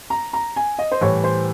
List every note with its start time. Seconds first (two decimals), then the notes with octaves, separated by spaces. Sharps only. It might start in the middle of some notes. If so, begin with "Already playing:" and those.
0.10 A#5
0.33 A#5
0.56 G#5
0.79 D#5
0.92 C5
1.01 A2 E3 G3 C#5
1.24 C5